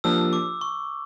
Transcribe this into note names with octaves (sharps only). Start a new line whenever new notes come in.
F3 A#3 D4 G4 E6
D6
C#6